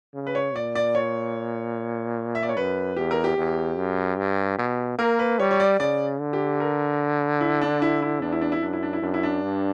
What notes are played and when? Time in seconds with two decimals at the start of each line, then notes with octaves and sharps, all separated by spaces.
0.14 C#3
0.27 B4
0.35 C#5
0.56 A#2 D5
0.75 D5
0.95 C#5
2.35 E5
2.43 D5
2.49 C#5
2.56 F#2 B4
2.96 E2 G4
3.11 A#4
3.24 G4
3.38 E2
3.77 F#2
4.18 G2
4.59 B2
4.99 A#3 A#4
5.19 B4
5.39 G3 C#5
5.51 C#5
5.60 D5
5.80 C#3 D5
6.20 D3
6.33 G4
6.60 A#4
7.41 E4
7.61 D4
7.82 E4
8.02 E4
8.21 E2 D4
8.32 E4
8.41 D4
8.52 E4
8.62 F#2 D4
8.73 E4
8.83 D4
8.93 E4
9.02 F#2 D4
9.14 E4
9.23 D4
9.43 G2